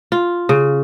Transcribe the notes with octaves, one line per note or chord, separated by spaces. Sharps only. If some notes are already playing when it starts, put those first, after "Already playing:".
F4
C#3